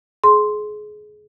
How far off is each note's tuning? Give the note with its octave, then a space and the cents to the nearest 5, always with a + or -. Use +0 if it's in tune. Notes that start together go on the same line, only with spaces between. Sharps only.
G#4 +25 C6 +0